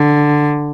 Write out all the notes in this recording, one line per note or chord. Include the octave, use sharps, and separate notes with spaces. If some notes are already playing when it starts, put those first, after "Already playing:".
Already playing: D3